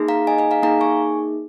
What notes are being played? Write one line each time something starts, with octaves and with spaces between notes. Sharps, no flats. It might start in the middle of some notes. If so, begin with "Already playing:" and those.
Already playing: A#3 D#4 G#4
F5 A#5
D#5 G#5
D#5 G#5
F5 A#5
A#3 D#4 G#4 F5 A#5
G#5 C#6